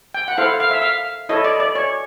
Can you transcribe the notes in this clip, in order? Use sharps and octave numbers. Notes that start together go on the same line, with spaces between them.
G5
F#5
E4 A4 C5 F5
F5
E5
F5
E4 A4 C#5 D#5
D5
D5
C#5